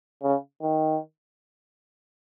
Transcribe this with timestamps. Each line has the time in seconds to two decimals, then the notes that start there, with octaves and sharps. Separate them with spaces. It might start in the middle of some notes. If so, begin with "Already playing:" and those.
0.22 C#3
0.62 D#3